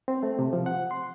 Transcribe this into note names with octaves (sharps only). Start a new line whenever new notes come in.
C4
A3
C3
F3
F#5
C6